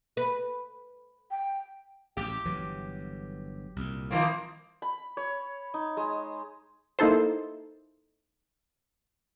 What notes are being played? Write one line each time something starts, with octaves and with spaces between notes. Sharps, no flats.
B4
G5
A1 G4
G1 E3 F#3
C2 A#2
D#3 F3 A#3
B5
C#5
D#4
G#3
A#3 D#4 E4 A4 C5